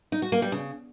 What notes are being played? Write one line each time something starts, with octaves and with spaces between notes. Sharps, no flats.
D#4
F#4
A#3
G3
C#3